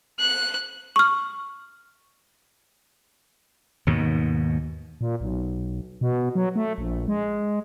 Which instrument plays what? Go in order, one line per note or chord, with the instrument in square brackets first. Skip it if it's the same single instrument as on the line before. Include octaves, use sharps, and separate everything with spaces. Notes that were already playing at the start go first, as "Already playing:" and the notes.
[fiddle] F#6
[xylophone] C#6 F6
[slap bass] D#2 G#2 B2
[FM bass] A#2
B1
B2
F#3
A3
A#1
G#3